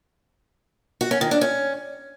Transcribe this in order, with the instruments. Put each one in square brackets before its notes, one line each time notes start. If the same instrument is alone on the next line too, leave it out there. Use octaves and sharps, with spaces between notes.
[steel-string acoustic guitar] F#4
C#4
D#3
D4
C#4